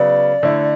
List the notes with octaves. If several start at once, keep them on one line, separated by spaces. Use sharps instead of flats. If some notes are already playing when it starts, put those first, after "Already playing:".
Already playing: C#3 F#3 B3 D5
D3 A3 E4